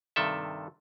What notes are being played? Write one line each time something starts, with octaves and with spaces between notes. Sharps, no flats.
G2 C3 D#3 A4 E5